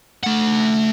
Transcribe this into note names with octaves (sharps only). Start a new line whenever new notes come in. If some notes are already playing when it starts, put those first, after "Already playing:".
A3 F#5